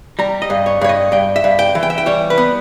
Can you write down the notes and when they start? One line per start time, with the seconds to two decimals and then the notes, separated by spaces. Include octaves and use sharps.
0.19 G3 A#5
0.42 D#5
0.50 G2
0.66 C#5
0.81 G2 C#5
0.89 D#5
1.12 G2 G5
1.36 E5
1.44 G2
1.59 G5
1.75 E3
1.83 G5
1.90 E5
1.98 G5
2.06 G3 C#5
2.30 B4
2.38 B3